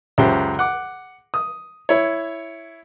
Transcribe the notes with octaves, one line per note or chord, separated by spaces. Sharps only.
C#2 F#2 G4 C5 E5
F#5 D6
D#6
E4 C#5